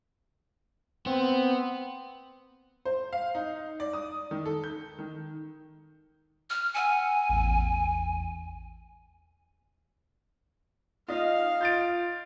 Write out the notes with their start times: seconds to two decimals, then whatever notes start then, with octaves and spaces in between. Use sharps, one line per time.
1.06 B3 C4
2.85 C5
3.13 F5
3.35 D#4
3.80 D5
3.93 D#6
4.31 D#3
4.46 A4
4.64 G6
4.99 D#3
6.50 F6
6.74 F#5 G#5 E6 C#7
7.29 A1 E2
11.08 D#4 F4 D#5 F5
11.61 F4 G6 A6 D7